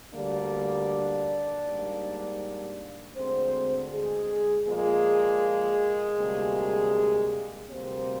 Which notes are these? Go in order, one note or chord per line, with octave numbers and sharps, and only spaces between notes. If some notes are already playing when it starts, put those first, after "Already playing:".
D2 D3 G3 A#3 D4 D5
G#2 G3 A#3
D2 D3 G#3 C4 C5
G#3 G#4
A#2 F3 G#3 A#3 G#4
D2 C3 G3 A#3
D2 C3 G3 A#3 C4 C5